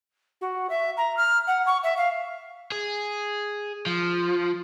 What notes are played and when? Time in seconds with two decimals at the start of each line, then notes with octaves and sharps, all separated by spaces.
0.41 F#4
0.70 E5
0.97 A#5
1.17 F6
1.47 F#5
1.66 C#6
1.84 E5
1.97 F5
2.72 G#4
3.86 F3